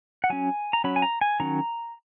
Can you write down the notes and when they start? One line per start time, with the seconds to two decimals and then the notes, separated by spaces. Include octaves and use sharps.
0.24 F#5
0.30 F#3 C#4 G#5
0.73 A#5
0.84 F#3 C#4 B5
0.96 G#5
1.02 A#5
1.21 G#5
1.40 D#3 F#3 C#4 A#5